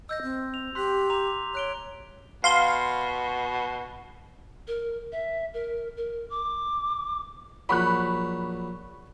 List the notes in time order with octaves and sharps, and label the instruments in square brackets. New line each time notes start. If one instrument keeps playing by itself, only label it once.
[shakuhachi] D#5 [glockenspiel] E6 G6 A#6
[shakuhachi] C4
[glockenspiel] F7
[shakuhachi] G4 [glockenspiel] C6 F#6 B6
[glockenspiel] A#5 D6 F7
[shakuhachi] C#5 [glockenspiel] F#6 D7 G7
[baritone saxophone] B2 [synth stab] F5 C6
[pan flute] A#4
E5
A#4
A#4
D6
[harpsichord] A#1 F#3 [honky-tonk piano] B5 C#6 F#6